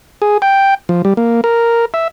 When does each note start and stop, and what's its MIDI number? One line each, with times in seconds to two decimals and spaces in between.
0.22 0.38 68
0.42 0.74 79
0.89 1.02 53
1.05 1.14 55
1.17 1.41 58
1.44 1.85 70
1.94 2.08 76